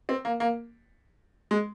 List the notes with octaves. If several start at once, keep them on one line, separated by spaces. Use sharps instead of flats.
C4
A#3
A#3
G#3